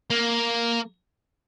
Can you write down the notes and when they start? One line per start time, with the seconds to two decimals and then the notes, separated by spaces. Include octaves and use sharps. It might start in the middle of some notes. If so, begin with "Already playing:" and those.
0.10 A#3